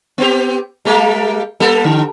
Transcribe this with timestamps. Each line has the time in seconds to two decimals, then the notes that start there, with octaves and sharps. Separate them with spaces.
0.18 B3 C4 G4
0.85 G3 G#3 A#3
1.60 G3 A#3 A4
1.84 D3